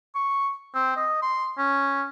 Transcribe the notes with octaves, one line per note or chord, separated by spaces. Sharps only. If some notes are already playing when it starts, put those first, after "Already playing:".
C#6
C4
D#5
C6
C#4